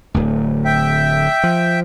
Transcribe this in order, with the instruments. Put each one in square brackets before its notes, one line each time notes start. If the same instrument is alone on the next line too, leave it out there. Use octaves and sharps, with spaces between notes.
[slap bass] D1 D2
[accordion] E5 G5
[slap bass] F3